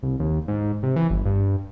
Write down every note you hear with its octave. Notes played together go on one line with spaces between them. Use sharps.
C2
D#2
G#2
C3
E3
G1
G2